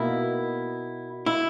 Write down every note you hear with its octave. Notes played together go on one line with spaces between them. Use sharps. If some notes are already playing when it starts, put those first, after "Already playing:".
Already playing: B2 A#3 D#4 E4
E4